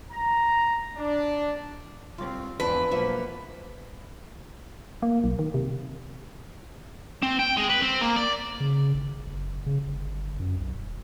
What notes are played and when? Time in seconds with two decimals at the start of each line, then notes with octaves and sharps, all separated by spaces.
0.11 A#5
0.97 D4
2.18 C2 C4 F4
2.60 E2 G#2 F3 C4 D4 B4
2.91 B1 F3 A#3 E5 F#5
5.02 A#3
5.24 B1
5.39 D#3
5.54 C3
7.23 C4
7.39 G5
7.57 G#3
7.69 B4
7.81 C4
8.01 A#3
8.16 D5
8.60 C#3
8.94 G#1
9.26 F#1
9.66 C#3
9.86 G1
10.40 F#2
10.60 B1
10.74 D#1